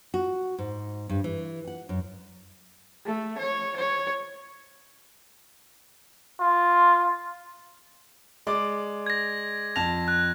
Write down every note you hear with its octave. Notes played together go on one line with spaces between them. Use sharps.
F#4
G#2
G2
E3
F#5
F#2
A3
C#5
C#5
F4
G#3 D5 D6
G#6 A#6
F2 A5 A#6 F7
F#6